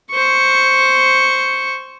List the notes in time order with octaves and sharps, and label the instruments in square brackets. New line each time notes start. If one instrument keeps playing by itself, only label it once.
[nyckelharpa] C5 C#6